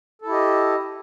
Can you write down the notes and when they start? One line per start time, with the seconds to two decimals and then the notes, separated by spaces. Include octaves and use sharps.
0.22 A4
0.25 E4
0.29 G4
0.33 D#5